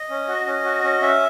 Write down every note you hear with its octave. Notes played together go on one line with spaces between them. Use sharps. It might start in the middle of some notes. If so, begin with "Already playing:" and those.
Already playing: D#5
C#4
F#4
C#4
F#4
C#4
C#4 E5